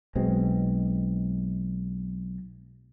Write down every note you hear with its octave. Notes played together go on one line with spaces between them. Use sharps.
B1 B2 G#3 C4